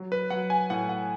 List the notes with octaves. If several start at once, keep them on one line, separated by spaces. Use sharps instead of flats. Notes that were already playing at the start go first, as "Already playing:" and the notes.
Already playing: F#3
B4
F#3 F#5
G#5
A2 F#5
F#5